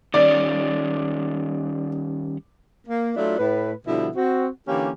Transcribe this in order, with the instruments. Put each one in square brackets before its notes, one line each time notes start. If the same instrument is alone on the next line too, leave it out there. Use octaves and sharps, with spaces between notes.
[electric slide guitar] D#3 G3 C#4 [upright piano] D5
[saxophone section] A#3
F#3 A3 D4 E4 F4
A2 B4
B2 D3 F3 G3 B3 E4
C4 F#4
D3 E3 A#3 C#4 G4